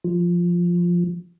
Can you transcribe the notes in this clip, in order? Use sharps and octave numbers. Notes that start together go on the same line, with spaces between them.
F3